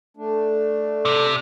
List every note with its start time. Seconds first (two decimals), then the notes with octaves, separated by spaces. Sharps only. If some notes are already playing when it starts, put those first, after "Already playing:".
0.17 A3 D4
1.05 C3